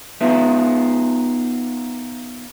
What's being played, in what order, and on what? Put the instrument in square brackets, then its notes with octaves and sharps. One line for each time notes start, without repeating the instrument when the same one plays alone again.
[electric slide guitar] B3 D#4 F4 B4 E5